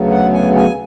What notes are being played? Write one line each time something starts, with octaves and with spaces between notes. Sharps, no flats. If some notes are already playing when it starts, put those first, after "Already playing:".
Already playing: D2 C#3 F#3 B3
F#5
G#5
G#5